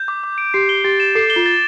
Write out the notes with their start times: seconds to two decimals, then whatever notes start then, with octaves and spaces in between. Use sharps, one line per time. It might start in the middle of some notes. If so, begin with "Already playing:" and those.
Already playing: G6
0.08 D6
0.24 D6
0.38 D7
0.54 G4 C7
0.69 G7
0.84 G4 A6
1.00 E7
1.15 A4 C7
1.30 G7
1.36 F4
1.46 A6